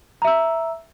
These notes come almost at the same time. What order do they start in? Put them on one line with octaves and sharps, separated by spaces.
A#5 E5 E6